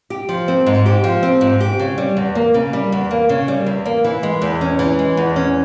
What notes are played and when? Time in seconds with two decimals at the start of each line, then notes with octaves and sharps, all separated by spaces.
0.10 G4
0.29 F3
0.48 C4
0.66 G#2
0.86 G4
1.04 F3
1.23 C4
1.41 G#2
1.60 G4
1.80 C#3
1.98 G3
2.17 E2
2.35 A#3
2.54 C#3
2.73 G3
2.92 E2
3.11 A#3
3.29 C#3
3.48 G3
3.66 E2
3.86 A#3
4.04 E3
4.23 G#3
4.42 E2
4.61 C#4
4.79 E3
4.99 G#3
5.17 E2
5.36 C#4